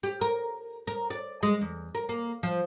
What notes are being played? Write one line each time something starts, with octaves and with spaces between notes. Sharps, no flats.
G4
A#4
A#4
D5
G#3
E2
A#4
A#3
F3